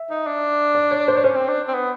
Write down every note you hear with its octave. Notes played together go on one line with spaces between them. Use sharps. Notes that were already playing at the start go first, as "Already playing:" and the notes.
Already playing: E5
D#4
D4
D5
C#5
C5
C#5
C#4 C5
C4
D4
C4
B3